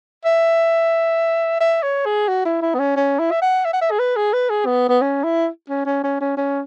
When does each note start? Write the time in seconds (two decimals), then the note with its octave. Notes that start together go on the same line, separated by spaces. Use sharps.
0.25 E5
1.60 E5
1.83 C#5
2.06 G#4
2.28 F#4
2.45 E4
2.62 E4
2.74 B3
2.79 C#4
2.96 C#4
3.19 E4
3.31 E5
3.42 F#5
3.65 E5
3.73 F#5
3.81 E5
3.91 G#4
3.99 B4
4.16 G#4
4.33 B4
4.50 G#4
4.66 B3
4.89 B3
5.02 C#4
5.24 E4
5.70 C#4
5.86 C#4
6.04 C#4
6.21 C#4
6.37 C#4